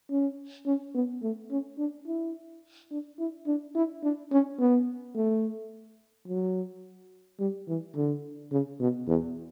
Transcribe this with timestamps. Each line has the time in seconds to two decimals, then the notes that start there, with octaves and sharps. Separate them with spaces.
0.11 C#4
0.66 C#4
0.94 B3
1.22 A3
1.51 C#4
1.79 D4
2.07 E4
2.91 D4
3.19 E4
3.47 D4
3.75 E4
4.03 D4
4.32 C#4
4.59 B3
5.15 A3
6.28 F#3
7.40 G3
7.68 E3
7.95 D3
8.52 C#3
8.80 B2
9.08 E2